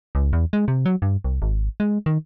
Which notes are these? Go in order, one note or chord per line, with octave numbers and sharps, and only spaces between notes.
C#2
E2
G#3
C3
F#3
G2
C2
G#1
G#3
D#3